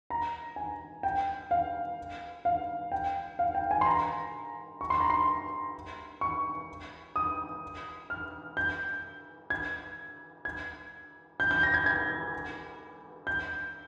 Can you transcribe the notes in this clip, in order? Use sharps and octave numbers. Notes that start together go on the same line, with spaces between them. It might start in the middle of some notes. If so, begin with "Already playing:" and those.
A#5
G#5
G5
F5
F5
G5
F5
G5
G#5
C6
A#5
C#6
C6
A#5
C6
C#6
D#6
F6
G6
G#6
G#6
G6
G6
A#6
G#6
G#6
G6